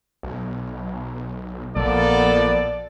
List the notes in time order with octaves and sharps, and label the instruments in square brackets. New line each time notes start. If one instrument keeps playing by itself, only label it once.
[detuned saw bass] B1
[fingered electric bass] A#1 [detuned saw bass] F3 [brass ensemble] A#3 B3 A4 [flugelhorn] D5